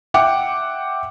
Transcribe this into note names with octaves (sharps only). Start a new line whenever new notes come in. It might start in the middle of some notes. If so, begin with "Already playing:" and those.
E5 F#5 G5 D6